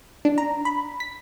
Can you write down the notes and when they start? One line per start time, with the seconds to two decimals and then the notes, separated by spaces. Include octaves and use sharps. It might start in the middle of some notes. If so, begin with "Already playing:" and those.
0.25 D4
0.38 A#5
0.65 B5
1.00 B6